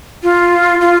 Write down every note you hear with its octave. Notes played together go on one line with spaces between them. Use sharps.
F4
F4